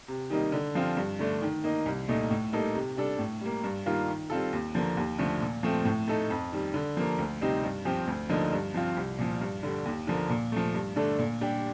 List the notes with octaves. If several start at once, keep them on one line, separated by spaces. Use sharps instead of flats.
C3
D#3 G3 A#3 D#4
D3
F3 C4 F4
G2
D3 A3 D4
D#3
A#3 D#4
C2
A#2 A3 D#4
A2
G3 A#3 D#4 A4
C3
G3 D4 A4
A2
G3 A#3
G2
D#3 G3 A#3 F4
D#3
G3 C4 F4 A4
D#2
D3 F3 A#3
D#2
D3 F3 A3
A#2
F3 A3 C4
A2
A3 D#4 A4
F2
D#3 G3
D3
F3 A#3
D2
C3 G3 C4 D#4
G2
F3 C4 G4
D2
D3 F3 A#3 D#4
G2
F3 C4 F4
C2
A#2 F3
G2
D3 G3
D#2
D3 F3 A#3
A#2
F3 A3
G2
D3 A3 D4 A4
A#2
G3 D4 G4